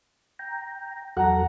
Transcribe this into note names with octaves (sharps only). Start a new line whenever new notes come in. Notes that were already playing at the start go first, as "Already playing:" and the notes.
G5 A#5
E2 F#3 A4 F#5 A#5